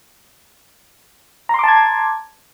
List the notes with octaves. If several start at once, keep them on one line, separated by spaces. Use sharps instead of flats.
A5 A#5 C6 D6 G#6